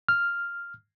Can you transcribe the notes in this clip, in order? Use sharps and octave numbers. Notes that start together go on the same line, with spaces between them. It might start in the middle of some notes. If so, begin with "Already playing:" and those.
F6